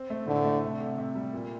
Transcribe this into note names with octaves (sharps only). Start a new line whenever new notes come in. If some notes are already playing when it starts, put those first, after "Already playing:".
Already playing: C4
A3
A2 D3
A3
C3
C3
C3
G3
A#2